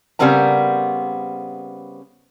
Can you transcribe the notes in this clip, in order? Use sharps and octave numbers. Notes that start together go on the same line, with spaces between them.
C#3 G3 B3 C4 A#4 A#5